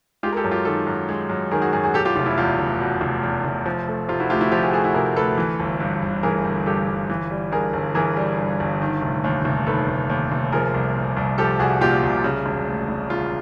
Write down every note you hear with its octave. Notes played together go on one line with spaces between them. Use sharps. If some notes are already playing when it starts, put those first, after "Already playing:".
G#3 F4 G4
A#4
G4 A4
F#2
F4 G4
D#3 G4 A4
F#2
G#3
F#2
D#3 G#4 A#4
F#4 G#4
F#2 F#4 G#4
F#4 G#4
B2 G4 A4
F4 G4
F1 F4
E4
E2 F4
F1
B2
F1
E2
F1
F3
A3
C3 F4
E4 F#4
D2 F4 G4
E4 F#4
F3 F4 G4
F#4 G#4
G4
A3 F#4 G#4
E4 F#4
C3 G#4 A#4
D2 A4 B4
E3
G1
G2
G1
E3 G#4 A#4
G1
G2 G4 A4
G1
E3
G3
G2 G#4 A#4
G1
E3 G#4 A#4
G3
G2
G1
D#3
F1
D#2
F1
D#3 A4 B4
F1
D#2
F1
F3 G#4 A#4
C2
A#2
C2
F3 G4 A4
C2 F#4 G#4
A#2 F4 G4
C2
C#3
E1
D2
E1
C#3 F4